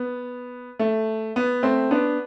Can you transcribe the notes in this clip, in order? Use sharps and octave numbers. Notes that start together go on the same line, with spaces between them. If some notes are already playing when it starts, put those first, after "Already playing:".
Already playing: B3
A3
B3
A3 C4
B3 D4